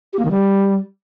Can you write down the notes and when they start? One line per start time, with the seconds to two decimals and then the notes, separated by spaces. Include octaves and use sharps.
0.13 G4
0.19 A#3
0.25 D#3
0.31 G3